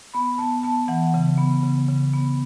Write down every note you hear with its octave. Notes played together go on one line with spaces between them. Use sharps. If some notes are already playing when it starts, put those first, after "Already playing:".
B3 B5
B3 A5
B3 A5
E3 F#5
C#3
B3
C#3
C#3
B3